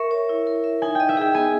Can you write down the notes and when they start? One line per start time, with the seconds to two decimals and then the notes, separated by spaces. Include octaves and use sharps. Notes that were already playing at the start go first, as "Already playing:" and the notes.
Already playing: A#4 E5 C#6
0.11 C#5
0.29 E4
0.47 A#4
0.64 E5
0.82 D#4 G#5
0.95 D#5 G5
1.09 E5
1.17 G#4 G5
1.35 B3 G#5